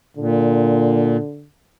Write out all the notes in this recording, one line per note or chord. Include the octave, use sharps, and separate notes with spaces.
A#2 D3